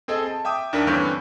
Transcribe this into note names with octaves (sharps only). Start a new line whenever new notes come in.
C4 G#4 A4 D#5
A5
E5 G5 D6 D#6
D#2 D4 A#4 B6
G2 D3 E3 C4 C#4 G6